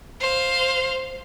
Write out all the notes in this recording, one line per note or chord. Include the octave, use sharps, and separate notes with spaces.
C5 F5